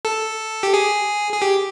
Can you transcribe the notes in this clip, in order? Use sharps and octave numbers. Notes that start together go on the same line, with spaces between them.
A4
G4
G#4
G#4
G4